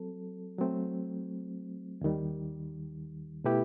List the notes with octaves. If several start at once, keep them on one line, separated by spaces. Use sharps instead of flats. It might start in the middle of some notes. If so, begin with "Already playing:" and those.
Already playing: F#3 C4 A4
F#3 A3 C4
D#2 D#3 G3
B2 A3 E4 G4 B4